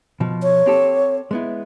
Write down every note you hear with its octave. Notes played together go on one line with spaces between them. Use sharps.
B2 F3
C#5
C4 G4 A4
G#3 B3 E4